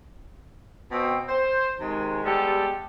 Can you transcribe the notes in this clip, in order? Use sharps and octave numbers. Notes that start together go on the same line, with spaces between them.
B2 C4
C5
C3 D#3 G#3
G3 G#3 B3 G4 A4